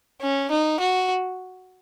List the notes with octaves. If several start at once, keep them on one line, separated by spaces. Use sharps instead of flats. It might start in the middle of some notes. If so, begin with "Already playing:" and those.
C#4
D#4
F#4